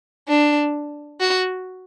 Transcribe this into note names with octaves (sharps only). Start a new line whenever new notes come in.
D4
F#4